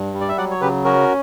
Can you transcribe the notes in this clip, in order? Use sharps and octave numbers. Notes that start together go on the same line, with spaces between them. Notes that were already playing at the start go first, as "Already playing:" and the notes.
Already playing: G2
G3
D5
E5
F#3 D5 F#5
C#5
C#3 G4 B4
C#4 F#4 A#4